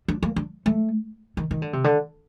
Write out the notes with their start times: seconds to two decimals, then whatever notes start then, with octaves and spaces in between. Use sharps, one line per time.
0.08 D4
0.23 A#3
0.36 D4
0.66 A3
1.37 D#3
1.51 D#3
1.62 D3
1.73 C3
1.84 D3